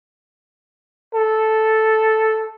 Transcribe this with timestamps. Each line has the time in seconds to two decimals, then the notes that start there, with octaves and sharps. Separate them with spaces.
1.15 A4